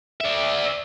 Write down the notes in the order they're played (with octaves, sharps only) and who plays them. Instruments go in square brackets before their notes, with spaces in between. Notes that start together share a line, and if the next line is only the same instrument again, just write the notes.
[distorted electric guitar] D5 E5